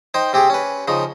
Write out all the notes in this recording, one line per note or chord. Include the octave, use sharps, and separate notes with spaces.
D#4 C5 G5
C3 C4 G4 G#4
C#4 B4
C#3 F3 D#4